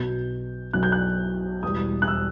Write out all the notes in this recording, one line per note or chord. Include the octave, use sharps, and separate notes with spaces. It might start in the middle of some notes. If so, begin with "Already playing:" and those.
Already playing: B1 B2 F#3 G6
B1 B2 F#3 F#6
G6
F#6
E1 E2 B2 G3 D#6
F#6
E6